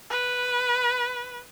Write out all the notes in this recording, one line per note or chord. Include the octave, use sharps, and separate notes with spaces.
B4